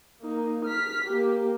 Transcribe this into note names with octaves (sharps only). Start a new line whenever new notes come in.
A#3 D#4
F6 B6
A#3 G4